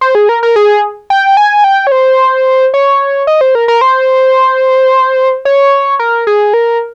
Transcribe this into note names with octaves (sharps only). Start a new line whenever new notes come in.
C5
G#4
A#4
A#4
G#4
G5
G#5
G5
C#5
C5
C#5
D#5
C5
A#4
A#4
C5
C#5
A#4
G#4
A#4